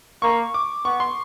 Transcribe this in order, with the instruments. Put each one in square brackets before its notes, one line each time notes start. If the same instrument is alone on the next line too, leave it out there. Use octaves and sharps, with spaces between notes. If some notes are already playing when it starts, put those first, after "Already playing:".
[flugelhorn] A#3 [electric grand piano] C#6
[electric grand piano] D6
[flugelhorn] B3 [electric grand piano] C#6
[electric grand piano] C6